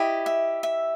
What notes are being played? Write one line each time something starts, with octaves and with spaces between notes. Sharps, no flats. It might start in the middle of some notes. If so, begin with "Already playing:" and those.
Already playing: E4 G4 D#5
E5
E5